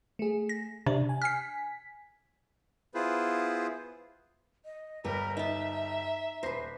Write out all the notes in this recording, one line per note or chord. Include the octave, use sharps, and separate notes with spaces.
A3 G#4
A#6
C3 D4
G#5
G#5 F6 B6 C7
B3 E4 F4 G#4 B4 C5
D#5
G1 G3 G4 A#4 B4 A#5
D#4 E5 A5
D#1 B4 C5 A#6 C7